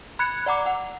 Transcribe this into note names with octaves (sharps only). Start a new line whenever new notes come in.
B5 F#6 G#6 C#7
D5 F#5 A#5 D6
F#5